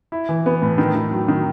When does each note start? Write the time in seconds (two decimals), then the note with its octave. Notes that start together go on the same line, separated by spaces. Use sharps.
0.12 E4
0.29 E3
0.46 B3
0.62 A2
0.78 D#3
0.95 D#3
1.11 F#3
1.28 D#3